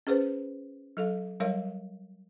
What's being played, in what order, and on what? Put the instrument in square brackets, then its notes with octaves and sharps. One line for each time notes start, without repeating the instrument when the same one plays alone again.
[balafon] C#4 G#4 B4 C5
F#3 A4 F5
F#3 G3 A#4 C#5 F5